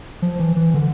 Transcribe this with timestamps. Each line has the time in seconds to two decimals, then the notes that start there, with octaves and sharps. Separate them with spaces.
0.22 F3
0.39 E3
0.57 E3
0.74 D3